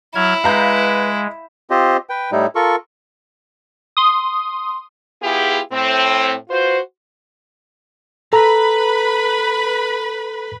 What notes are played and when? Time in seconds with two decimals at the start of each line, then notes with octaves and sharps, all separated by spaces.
0.15 F#3 E4 F6 G#6
0.44 G#3 B4 F5 A#5 G6
1.70 C4 F4 G4 C5 D#5
2.10 B4 G5
2.32 A2 G3 D#4 E4
2.55 F4 A4 A#4 C#6
3.97 C6 D#6
5.22 B3 E4 F4 G4 G#4
5.72 A2 C4
6.49 F4 F#4 B4 C5
8.33 A4 B4 A#5 B5